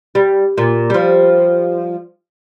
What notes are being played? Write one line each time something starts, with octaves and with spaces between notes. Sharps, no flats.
G3
A#2
F3 G3